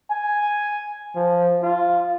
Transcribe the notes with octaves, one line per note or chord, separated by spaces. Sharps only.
G#5
F3
F4